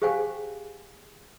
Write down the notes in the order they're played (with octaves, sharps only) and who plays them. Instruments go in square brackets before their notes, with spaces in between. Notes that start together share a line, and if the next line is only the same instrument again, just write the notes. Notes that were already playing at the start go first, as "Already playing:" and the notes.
[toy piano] G4 G#4 C5 F5 G5 G#5